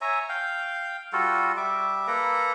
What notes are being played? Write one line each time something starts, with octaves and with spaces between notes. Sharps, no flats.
C#5 E5 G#5 A#5
F5 G5
G3 F4 F#4 A4
G3 E5 D6
A#3 A4 B4 A#5